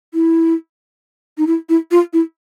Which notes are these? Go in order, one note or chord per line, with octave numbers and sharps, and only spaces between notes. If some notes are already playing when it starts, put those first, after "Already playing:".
E4
D#4
E4
E4
F4
E4